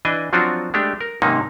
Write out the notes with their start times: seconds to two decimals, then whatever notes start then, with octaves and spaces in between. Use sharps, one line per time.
0.05 E3 D4 D#5 G#5
0.33 F3 F#3 C4 D4 F4 F#4
0.74 G#3 A3 D4 G4
1.01 A#4
1.22 G#2 C3 D#3 A#3 C#4 D#4